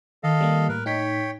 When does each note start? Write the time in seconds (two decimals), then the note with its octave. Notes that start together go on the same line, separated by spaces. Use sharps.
0.23 D#3 A4 D#5 F5
0.41 G3 A#3
0.69 A2 A#4 B4
0.86 A2 D#4 C#5 G5 B6